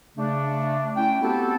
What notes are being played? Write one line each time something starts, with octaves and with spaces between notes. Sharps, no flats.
C#3 A3 D4
A3 C#4 E4 G5
B3 C4 F#4 G4 A4